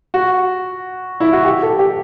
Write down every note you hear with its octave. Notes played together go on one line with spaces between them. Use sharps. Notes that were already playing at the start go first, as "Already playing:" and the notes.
F#4
E4
F#4
G4
A4
G4